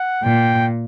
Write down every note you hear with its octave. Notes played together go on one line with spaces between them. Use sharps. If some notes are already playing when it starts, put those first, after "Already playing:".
Already playing: F#5
A#2 G5